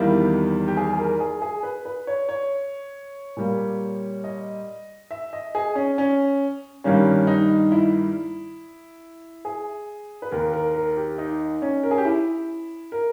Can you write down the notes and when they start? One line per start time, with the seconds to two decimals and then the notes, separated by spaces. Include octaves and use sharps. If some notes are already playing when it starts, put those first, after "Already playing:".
Already playing: E2 D#3 G3 A#3 E4
0.68 G4
0.77 G#4
0.93 G#4
0.98 A#4
1.20 G#4
1.42 G#4
1.63 B4
1.85 B4
2.07 C#5
2.29 C#5
3.37 A#2 G3 A#3
4.24 D#5
5.11 E5
5.33 D#5
5.55 G#4
5.75 C#4
5.98 C#4
6.84 G2 D#3 G3 A#3 C#4
7.27 D#4
7.72 E4
9.45 G#4
10.22 B4
10.31 D#2 D#3 A#3 A#4
10.53 A#4
10.75 A#4
10.97 G4
11.18 D#4
11.62 C#4
11.83 A#4
11.91 G#4
11.98 G4
12.05 E4
12.92 A#4